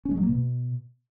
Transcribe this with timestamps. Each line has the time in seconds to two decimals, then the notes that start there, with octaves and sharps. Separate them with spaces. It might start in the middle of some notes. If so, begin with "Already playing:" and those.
0.05 C#4
0.11 G#3
0.17 F#3
0.23 A#3
0.29 B2